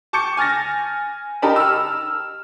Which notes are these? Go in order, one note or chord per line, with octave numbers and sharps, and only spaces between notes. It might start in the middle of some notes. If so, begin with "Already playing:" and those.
A5 C#6 D6 G6 C#7
G#5 F6 A6 A#6
D#4 G4 A#4 A5 B5
E6 F6